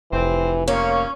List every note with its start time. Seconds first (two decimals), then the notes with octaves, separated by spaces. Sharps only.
0.12 F1 E3 C4 C5
0.68 A#2 F3 A#3 C#4 C#5